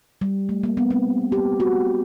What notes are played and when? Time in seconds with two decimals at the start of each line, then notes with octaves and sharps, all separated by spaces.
0.21 G3
0.49 A3
0.64 A#3
0.77 B3
0.90 C4
1.32 G4
1.60 F#4